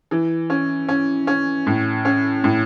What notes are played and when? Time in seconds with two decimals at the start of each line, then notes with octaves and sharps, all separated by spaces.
0.11 E3
0.50 C#4
0.88 C#4
1.27 C#4
1.67 A2
2.05 C#4
2.44 A2